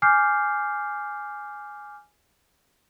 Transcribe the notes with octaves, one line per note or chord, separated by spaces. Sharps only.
G#5 D6 F6 G6 C7